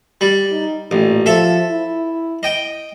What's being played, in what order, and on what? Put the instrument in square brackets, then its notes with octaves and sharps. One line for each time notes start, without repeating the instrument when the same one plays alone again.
[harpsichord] G3
[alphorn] D#4
[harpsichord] A1 [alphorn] A#2
[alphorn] F3 [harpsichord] A4 E5
[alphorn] E4
[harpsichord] D#5 G5